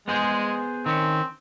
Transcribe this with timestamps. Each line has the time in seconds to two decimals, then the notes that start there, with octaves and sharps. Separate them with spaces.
0.08 G#3 B3 G#4 C5
0.86 D#3 C4 C#4